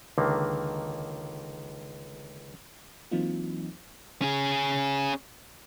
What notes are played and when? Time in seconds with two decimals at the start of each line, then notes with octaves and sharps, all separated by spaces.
0.18 C#2 D3 D#3 A#3
3.11 E3 F#3 A#3 C4 D#4 F4
4.22 C#4 G#4